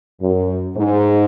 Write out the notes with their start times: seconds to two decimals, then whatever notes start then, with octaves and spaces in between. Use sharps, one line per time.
0.22 F#2
0.77 G#2